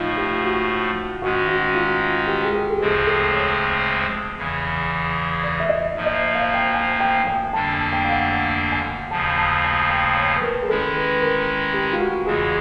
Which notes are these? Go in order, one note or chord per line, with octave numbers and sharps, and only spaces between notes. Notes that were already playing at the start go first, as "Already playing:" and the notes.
Already playing: A2 F3 A3 D#4 F4
G4
F#4
G#2 D#3 G#3 C#4 F#4
F#4
F4
G4
G#4
G4
A4
D2 C#3 F3 G#3 C4 G#4
A4
C#5
E2 C#3 E3
D5
E5
D#5
G#2 F3 A#3
D#5
E5
F5
G5
G#5
G5
G5
F2 D3 G3 A#3 D4 A5
G#5
G5
F5
F#5
F#5
G#5
D#2 C#3 F3 A5
A5
G#5
G5
C#5
B4
A#4
G#4
D#3 G#3 C#4 E4 A4
B4
A#4
G4
F4
F#4
E2 C#3 E3 G#3 G#4